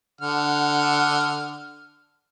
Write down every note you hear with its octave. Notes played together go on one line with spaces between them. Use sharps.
D3 F#5 F6